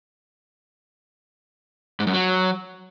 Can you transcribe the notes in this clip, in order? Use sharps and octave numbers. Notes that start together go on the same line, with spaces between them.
G#2
F#2
F#3